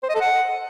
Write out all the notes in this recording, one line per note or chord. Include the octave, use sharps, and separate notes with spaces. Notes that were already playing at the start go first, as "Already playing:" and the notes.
C5
D#5
A4
F#5